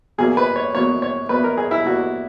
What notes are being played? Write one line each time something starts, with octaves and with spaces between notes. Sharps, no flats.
E2 B2 A#3 G#4
B4
C#5
E2 B2 A#3 C#5
C#5
E2 B2 A#3 B4
A#4
G#4
E4
E2 B2 A#3 F#4